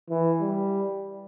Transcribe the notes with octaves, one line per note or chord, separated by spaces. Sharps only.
E3
G3